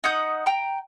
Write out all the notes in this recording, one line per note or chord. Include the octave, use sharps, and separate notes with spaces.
D#4 F#5 D#6 G6
G5 A#5